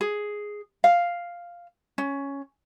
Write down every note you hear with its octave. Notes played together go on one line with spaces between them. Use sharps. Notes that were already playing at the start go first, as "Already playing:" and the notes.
G#4
F5
C#4